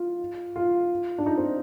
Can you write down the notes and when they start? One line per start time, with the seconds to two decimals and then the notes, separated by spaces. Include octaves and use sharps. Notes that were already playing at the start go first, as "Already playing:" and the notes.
Already playing: F4
0.56 F4
1.18 D4
1.26 D#4
1.37 C4